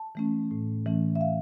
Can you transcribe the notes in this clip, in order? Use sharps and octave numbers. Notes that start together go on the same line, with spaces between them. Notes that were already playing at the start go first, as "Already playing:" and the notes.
Already playing: A5
E3 A3 C#4
A2
E3 A3 C#4
E5
F5